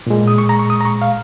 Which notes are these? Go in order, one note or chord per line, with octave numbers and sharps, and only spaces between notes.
A#2 G#3
D#6
C#6
A#5
C#6
D#6
A#5
C#6
F5